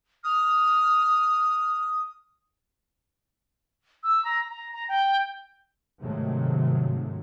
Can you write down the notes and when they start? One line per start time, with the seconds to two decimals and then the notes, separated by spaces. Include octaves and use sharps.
0.24 D#6 F6
4.04 E6
4.25 A#5
4.50 A#5
4.73 A#5
4.89 G5
6.02 G#2 C3 D#3 F3 F#3 A3